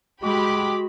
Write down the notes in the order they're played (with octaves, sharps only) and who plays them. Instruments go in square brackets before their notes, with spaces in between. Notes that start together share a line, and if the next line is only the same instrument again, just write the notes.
[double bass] G#3 [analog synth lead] F#4 [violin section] G4 B5 [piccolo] D6